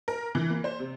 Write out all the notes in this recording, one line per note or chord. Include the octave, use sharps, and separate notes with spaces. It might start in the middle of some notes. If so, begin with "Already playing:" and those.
A#4
E3
A#3
C5
C3